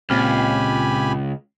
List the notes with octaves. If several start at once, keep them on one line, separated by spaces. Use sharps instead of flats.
C#2 A#2 C4 G4 G#5 B5 F6